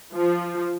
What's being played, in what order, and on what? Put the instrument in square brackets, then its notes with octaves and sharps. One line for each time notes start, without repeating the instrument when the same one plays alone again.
[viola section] F3